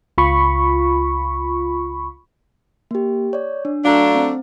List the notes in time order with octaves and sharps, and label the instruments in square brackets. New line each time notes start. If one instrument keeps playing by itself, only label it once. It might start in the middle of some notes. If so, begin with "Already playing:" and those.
[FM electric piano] C#2 F4 B5 C#6
[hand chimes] A#3 G4
C#5 D5
D4
[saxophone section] F#3 A3 D4 [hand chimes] F5 A#5
[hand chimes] C4